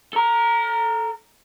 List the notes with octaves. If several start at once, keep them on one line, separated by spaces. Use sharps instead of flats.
A4 A#5